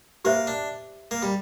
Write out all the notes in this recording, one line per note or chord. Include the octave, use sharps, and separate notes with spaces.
A#3 G4 C5 E5
D4
A#3
G3